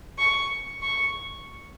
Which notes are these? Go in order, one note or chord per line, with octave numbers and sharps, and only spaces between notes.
C#6
C#6